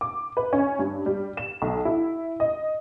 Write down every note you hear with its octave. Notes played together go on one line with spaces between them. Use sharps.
D6
B4
C#4
G2
G3
E7
B1
E4
D#5